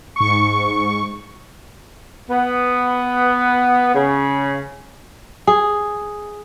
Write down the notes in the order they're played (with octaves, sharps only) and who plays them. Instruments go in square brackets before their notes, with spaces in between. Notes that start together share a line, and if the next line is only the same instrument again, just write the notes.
[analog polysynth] G#2 C#6
[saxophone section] B3
C#3
[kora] G#4